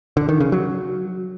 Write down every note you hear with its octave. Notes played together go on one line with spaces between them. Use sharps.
D3
D#3
C#3
F#3